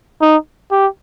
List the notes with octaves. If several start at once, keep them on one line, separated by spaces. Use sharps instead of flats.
D#4
G4